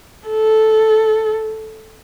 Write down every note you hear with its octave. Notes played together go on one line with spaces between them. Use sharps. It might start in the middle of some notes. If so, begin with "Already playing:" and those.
A4